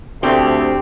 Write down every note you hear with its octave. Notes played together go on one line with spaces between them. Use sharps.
D2 A3 C4 G4